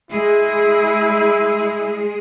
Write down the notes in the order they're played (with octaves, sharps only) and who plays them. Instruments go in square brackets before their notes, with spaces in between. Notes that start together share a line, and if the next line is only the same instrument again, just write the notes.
[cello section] G#3 G#4 [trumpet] E4